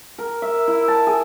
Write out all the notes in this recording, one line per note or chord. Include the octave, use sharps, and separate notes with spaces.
A#4
E5
E4
A5
G#4